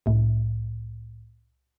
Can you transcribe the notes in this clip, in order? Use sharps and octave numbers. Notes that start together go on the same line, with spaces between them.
C2 A2